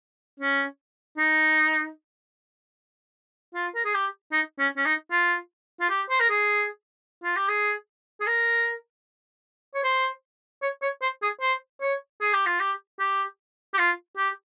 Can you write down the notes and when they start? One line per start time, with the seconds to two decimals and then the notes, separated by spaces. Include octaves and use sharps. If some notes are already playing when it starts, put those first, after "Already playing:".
0.40 C#4
1.18 D#4
3.55 F4
3.75 A#4
3.85 G#4
3.94 G4
4.32 D#4
4.59 C#4
4.77 C#4
4.86 D#4
5.11 F4
5.80 F4
5.90 G4
6.10 C5
6.20 A#4
6.30 G#4
7.24 F4
7.36 G4
7.48 G#4
8.21 G#4
8.27 A#4
9.74 C#5
9.84 C5
10.63 C#5
10.82 C#5
11.02 C5
11.22 G#4
11.41 C5
11.82 C#5
12.21 G#4
12.33 G4
12.46 F4
12.60 G4
12.99 G4
13.74 G4
13.78 F4
14.17 G4